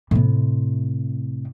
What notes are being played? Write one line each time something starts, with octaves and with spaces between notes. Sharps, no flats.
A2 C3